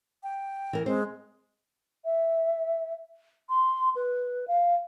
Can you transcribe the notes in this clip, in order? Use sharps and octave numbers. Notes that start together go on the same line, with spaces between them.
G5
E3 A#4
G#3 C4 C5
E5
C6
B4
F5